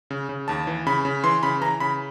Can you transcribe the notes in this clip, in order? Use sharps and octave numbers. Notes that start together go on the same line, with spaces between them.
C#3
C#3
D#2 A5
E3
C#3 B5
C#3
E3 C6
C#3 B5
E3 A#5
C#3 B5